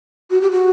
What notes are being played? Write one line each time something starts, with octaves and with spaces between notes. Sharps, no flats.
F#4
G4
F#4